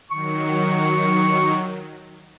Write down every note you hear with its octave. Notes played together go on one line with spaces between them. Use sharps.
D#3 F#3 C#6